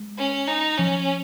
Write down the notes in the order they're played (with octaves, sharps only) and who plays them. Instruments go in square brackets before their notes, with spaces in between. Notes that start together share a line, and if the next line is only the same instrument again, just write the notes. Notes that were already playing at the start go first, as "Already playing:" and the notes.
Already playing: [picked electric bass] G#3
[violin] C#4
D#4
[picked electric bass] F3 [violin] C#4